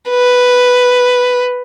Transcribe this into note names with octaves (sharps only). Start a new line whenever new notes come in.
B4